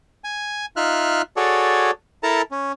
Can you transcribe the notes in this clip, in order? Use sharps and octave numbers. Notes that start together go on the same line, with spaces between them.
G#5
D#4 F4 E5 F6 F#6
F#4 G#4 A4 C#5 D5
E4 A4 A#4 A5 A#5
C#4